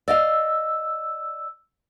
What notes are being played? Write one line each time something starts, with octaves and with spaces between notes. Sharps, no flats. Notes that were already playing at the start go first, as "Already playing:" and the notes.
D5 D#5 F5 E6